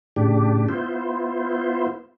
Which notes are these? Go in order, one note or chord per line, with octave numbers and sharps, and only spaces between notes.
A2 C#3 D4 G4
B3 E4 F4 C5